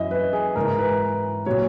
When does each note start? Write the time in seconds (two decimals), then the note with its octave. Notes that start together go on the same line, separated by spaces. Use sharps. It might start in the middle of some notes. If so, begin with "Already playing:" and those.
Already playing: F#2 E3 D#5 E5
0.11 B4
0.33 G#4
0.56 G#2 E3 A#4
0.79 B4
1.46 A#2 F#3 C#5